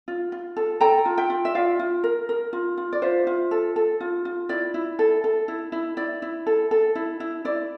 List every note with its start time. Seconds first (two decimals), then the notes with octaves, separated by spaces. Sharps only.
0.08 F4
0.32 F4
0.57 A4
0.81 A4 G5 A#5
1.06 F4
1.18 E5 G5
1.30 F4
1.45 E5
1.55 F4 D5 F5
1.79 F4
2.04 A#4
2.29 A#4
2.53 F4
2.78 F4
2.93 D5
3.02 F4 C5 E5
3.27 F4
3.51 A4
3.76 A4
4.01 F4
4.25 F4
4.49 E4 D5
4.74 E4
4.99 A4
5.24 A4
5.48 E4
5.72 E4
5.97 E4 D5
6.22 E4
6.47 A4
6.71 A4
6.95 E4
7.20 E4
7.45 E4 D5